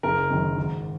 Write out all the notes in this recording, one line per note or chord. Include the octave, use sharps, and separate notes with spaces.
F#1 A#4
F#2 D#3
G#1